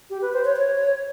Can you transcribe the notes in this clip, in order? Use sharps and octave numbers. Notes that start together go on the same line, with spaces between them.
G4
B4
C5
C#5
C#5